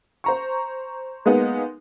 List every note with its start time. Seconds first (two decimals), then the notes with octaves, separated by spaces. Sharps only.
0.24 C5 A#5 C#6
1.26 G#3 A#3 B3 D#4